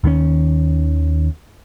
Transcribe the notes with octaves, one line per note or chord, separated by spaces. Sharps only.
D#2 D#3 F#3 C#4